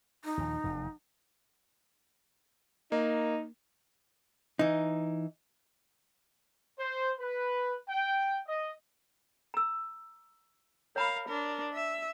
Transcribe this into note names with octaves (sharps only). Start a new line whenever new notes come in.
D#4
D#2 A#2 F3
F1 E2
A#3 D#4
E3 D#4
C5
B4
G5
D#5
A#5 E6
A#4 C#5 F5 A#5 B5
D4 A#4
E5